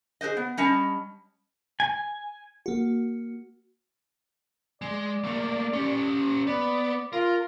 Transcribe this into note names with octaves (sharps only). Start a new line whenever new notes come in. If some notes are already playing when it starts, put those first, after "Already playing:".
G#4 B4 C5 D#5
B3
G3 C#4 D#5 A5
G#5
A#3 F#4
G#3 D5
A3 A#3
C#4 G4
B3 D5
F4 A#4